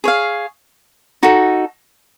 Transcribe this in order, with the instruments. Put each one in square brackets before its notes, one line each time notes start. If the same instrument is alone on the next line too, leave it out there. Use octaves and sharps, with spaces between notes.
[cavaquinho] G#4 C#5 F5
D#4 F#4 A4